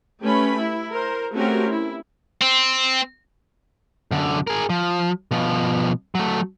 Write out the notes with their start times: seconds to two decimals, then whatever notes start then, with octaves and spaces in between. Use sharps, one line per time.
0.21 A3 C#4 G4 B4 B5
0.55 E4
0.90 A#4 C5
1.33 A3 C4 C#4 F#4 G4 A#4
1.69 E4
2.41 C4
4.11 F#2 D3
4.47 G#4 A#4
4.70 F3
5.31 B2 F3
6.15 F#3 A3